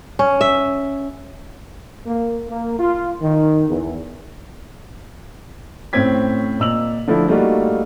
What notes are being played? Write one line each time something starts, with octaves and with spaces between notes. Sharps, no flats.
C#4
E5
A#3
A#3
F4
D#3
E2
A2 C4 C#4 C5 G#6 B6
A#2 D#5 E6 F7 F#7
D3 F3 A3 E4
G3 A3 A#3 D#4 F4 F#4